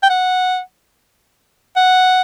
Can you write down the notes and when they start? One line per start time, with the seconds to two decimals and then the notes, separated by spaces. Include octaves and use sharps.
0.03 G5
0.10 F#5
1.76 F#5